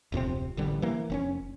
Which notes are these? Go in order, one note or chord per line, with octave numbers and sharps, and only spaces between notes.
D1 F2 C3 C4
A1 D3 G3
E3 A#3
F1 C4 C#4